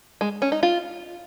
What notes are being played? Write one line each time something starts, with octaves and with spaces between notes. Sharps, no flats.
G#3
C#4
D#4
F4